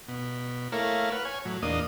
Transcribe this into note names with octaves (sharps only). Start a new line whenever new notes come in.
B2
A3 A#3 E4 A#4 C#5 F5
B4 F#5 F6
C#5 G#5
A2 F#3
E2 A#2 A#3 D4 D#5 D#6